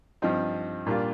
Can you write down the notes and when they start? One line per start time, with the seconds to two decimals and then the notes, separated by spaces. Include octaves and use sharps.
0.22 G2 F3 C4 D#4
0.86 A#2 G3 A#3 D4 F4